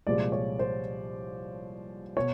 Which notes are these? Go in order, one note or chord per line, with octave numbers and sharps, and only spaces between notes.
C2 A#2 F3 G#3 D5
C#5
C5
B2 C#5